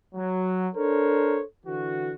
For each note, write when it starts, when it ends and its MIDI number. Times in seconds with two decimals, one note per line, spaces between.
0.15 0.68 54
0.75 1.42 62
0.75 1.42 69
0.75 1.42 70
0.75 1.42 72
0.75 1.42 73
1.66 2.13 50
1.66 2.13 52
1.66 2.13 66